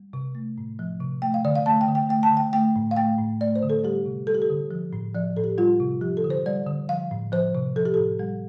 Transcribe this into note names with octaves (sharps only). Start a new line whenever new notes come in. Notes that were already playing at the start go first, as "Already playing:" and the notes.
Already playing: G3
C3
A3
A2
F3
C3
A3 G5
F5
D3 D5
F5
A3 A5
G5
D3
G5
A3 G5
A5
D3
G5
A3 G5
A2
F5
A3 G5
A2
A3 D5
C5
D3
A4
G3 G4
C3
G3 A4
G4
A4
D3
F3
A2
F3 D5
A2 A4
G4
G3 F4
C3
F3 G4
A4
D3
C5
G3 D5
D3
F3 F5
A2
F3 C5
C3
F3 A4
G4
A4
A2
G3